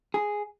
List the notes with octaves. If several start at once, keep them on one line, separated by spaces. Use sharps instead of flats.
G#4